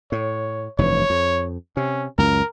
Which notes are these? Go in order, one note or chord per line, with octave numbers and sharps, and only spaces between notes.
A2 C#5
F1 G2 E3 C#5
F2
C3 C#4
C#2 F#2 A#4